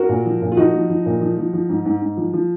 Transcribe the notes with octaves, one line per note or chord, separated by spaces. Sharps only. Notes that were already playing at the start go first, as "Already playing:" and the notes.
Already playing: F#4 A#4
A#2
F3
A#2
F4
F3 D#4 F#4
F3
F3
A#2
F3
F3
F3
G#2
G#2
G#2
F3
F3